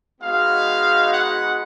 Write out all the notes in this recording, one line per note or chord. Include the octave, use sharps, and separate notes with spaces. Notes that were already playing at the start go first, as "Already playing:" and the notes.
G#3 B3 D#4 F#4 F5
F#5